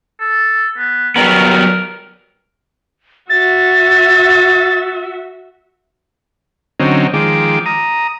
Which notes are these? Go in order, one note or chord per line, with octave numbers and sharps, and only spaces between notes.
A4
B3
F#3 G3 B3 A#4
F#4 E5 A6
D3 F#3 C4 C#4 D#4
D#3 F3 G#3 D6
A#5 D#6